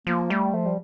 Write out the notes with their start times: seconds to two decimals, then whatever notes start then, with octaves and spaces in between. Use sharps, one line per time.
0.07 F3 A#3
0.30 G3 A3
0.53 F3 A3
0.66 G3